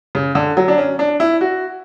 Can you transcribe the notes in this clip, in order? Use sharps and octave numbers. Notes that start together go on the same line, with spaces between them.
C#3
D3
F#3
D4
C#4
D4
E4
F#4